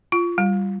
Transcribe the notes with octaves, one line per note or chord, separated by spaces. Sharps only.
F4
G3